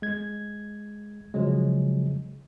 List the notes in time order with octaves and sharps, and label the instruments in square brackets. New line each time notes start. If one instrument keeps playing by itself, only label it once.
[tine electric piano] G#3 G#6
C#3 F3 F#3 G#3